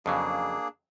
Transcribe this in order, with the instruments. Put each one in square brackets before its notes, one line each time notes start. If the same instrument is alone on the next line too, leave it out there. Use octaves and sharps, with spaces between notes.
[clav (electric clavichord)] F2 C#3 F#3 [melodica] A#3 D4 G#4